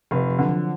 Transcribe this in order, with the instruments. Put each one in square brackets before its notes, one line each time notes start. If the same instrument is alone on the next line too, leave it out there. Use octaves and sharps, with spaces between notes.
[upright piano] F1 [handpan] F3
[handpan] F3
[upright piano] D3 [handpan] F#3
[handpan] F3